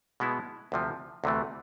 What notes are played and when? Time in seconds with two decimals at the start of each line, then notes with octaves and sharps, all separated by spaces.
0.20 B2 G#3 B3 E4
0.72 D2 C3 F3
1.24 D2 C3 E3 A3